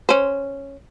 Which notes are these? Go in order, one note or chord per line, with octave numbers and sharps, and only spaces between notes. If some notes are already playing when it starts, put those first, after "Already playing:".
C#4 C5